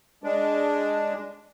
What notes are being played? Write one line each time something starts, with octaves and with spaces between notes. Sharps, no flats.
G#3 D4